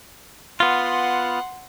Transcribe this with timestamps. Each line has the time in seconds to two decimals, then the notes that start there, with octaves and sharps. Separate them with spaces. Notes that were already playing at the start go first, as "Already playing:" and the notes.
0.60 B3 F4 F#5 C6